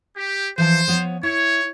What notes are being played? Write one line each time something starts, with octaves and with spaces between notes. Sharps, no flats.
G4
E3 F3 C5 A5
F3 B3 C#5
E4 C#5